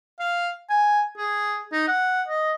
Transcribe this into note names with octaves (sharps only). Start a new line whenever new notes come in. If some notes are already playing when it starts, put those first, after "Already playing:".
F5
G#5
G#4
D#4
F#5
D#5